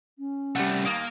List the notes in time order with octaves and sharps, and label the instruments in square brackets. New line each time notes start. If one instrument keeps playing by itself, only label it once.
[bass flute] C#4
[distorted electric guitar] C2 A3 [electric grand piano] G3 F#5
[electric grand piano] D#2 D#6 D7 [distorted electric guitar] A#3